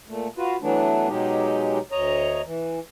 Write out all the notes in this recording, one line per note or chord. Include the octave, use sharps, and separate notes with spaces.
A#2 A3
F4 F#4 B4
E3 F#3 A3 B3 D4
B2 F#3 G#3 D#4 G4
D2 C#5 D#5 A#5
E3